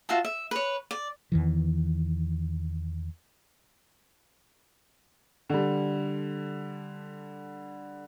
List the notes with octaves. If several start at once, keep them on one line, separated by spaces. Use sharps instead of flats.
F4 F#4 E5 A5
E5
B4 C#5
D5
E2 D#3 E3
D3 G3